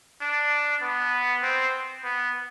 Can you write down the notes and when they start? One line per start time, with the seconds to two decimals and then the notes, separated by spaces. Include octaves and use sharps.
0.21 D4
0.82 B3
1.43 C4
2.04 B3